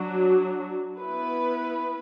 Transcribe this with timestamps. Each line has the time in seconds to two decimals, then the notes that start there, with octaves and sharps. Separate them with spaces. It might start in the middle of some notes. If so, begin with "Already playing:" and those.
Already playing: F#3 D4 F#4
0.99 B3 E4 B4